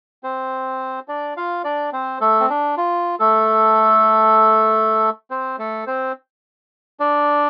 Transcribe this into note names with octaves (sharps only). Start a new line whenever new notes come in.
C4 C5
D4 D5
F4 F5
D4 D5
C4 C5
A3 A4
C4
D4
F4
A3 A4
C4 C5
A3 A4
C4 C5
D4 D5